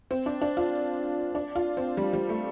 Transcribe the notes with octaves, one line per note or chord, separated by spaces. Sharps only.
C4
D4
D4
F4
D4
F4
C4
G3
G3
A3